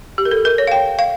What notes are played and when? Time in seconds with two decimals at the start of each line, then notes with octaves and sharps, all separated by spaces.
0.18 G4
0.25 A#4
0.31 A4
0.45 A#4
0.58 C#5
0.67 F5
0.72 G5
0.99 F5